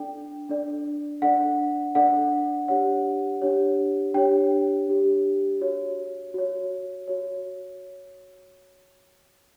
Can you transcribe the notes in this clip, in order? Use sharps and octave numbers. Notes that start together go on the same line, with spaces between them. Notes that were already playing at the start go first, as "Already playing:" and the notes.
Already playing: D4 A4 D5 G5
D4 A4 D5
D4 A4 D5 F#5
D4 A4 D5 F#5
D4 G4 C#5 F#5
D4 G4 C#5
D4 G4 C#5 G5
D4 G4 C#5
F#4 C#5
F#4 C#5
F#4 C#5